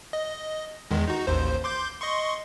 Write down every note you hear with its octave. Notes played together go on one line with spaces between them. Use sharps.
D#5
E2 D#3 G#3
D#4 F#4
A1 D#2 C5
C6 D6 G6
D#5 C6 C#6